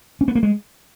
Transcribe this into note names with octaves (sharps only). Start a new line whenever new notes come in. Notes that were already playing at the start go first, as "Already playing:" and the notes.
C#4
B3
A#3
G#3